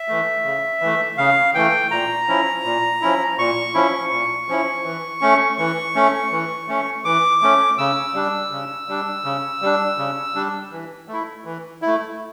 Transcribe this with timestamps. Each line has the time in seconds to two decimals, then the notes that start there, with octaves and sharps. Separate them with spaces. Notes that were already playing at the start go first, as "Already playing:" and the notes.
Already playing: E5
0.08 E3 A3
0.45 C#3
0.81 E3 A3
1.18 C#3 F5
1.54 E3 A3 G5
1.91 A#2 A#5
2.28 F3 C#4 E4
2.64 A#2
3.01 F3 C#4 E4
3.38 A#2 C#6
3.75 F3 C#4 E4
4.12 A#2
4.49 F3 C#4 E4
4.84 E3
5.21 A3 C#4
5.58 E3 C#6
5.95 A3 C#4
6.32 E3
6.68 A3 C#4
7.05 E3 D6
7.42 A3 C#4
7.78 C#3 E6
8.14 G3 D4
8.51 C#3
8.89 G3 D4
9.24 C#3
9.62 G3 D4
9.98 C#3
10.35 G3 D4
10.72 E3
11.08 A3
11.13 E4
11.45 E3
11.82 A3 E4